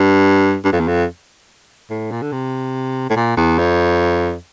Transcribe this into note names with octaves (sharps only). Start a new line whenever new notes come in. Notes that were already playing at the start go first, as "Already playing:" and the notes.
Already playing: G2
G2
F2
E2
F2
A2
A#2
D3
C3
A2
A#2
E2
F2